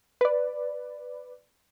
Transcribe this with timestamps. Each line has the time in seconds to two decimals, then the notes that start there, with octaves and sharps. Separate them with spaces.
0.21 B4 D5